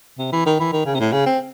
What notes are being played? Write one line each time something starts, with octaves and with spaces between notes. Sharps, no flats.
C3
E3
D#3
E3
D#3
C#3
C3
A2
C#3
C4